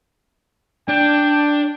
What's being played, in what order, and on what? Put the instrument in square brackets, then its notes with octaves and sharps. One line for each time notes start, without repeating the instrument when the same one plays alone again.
[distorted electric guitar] D4 [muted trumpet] G5